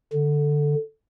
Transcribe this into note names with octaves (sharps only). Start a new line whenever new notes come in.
D3